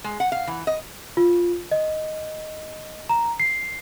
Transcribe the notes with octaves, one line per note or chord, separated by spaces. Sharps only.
G#3
F#5
F5
E3
D#5
F4
D#5
A#5
C7